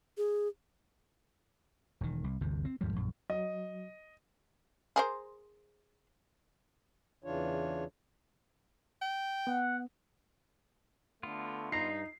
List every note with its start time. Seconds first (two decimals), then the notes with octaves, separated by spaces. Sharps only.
0.17 G#4
2.01 E1 D#3
2.24 C2
2.41 G1 D2 C3 E3
2.65 C4
2.81 D#2 G#2 F3 G3
2.93 A#1 F#2
3.30 F#3 D#5
4.96 G#4 A#4 C5
7.24 E2 C#3 E3 D4 F4 C#5
9.02 G5
9.47 B3 F#5
11.23 D3 A3 B3 F4
11.72 G2 D#4 A#5 C7